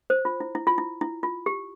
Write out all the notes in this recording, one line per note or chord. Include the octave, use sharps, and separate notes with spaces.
C5
F4
E4
E4
F4
E4
E4
F4
G4